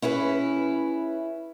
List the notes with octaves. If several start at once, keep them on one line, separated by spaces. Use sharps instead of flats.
C#4 E4 G#4 B4